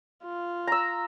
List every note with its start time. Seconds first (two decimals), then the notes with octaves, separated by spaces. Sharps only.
0.23 F4
0.67 A#5 E6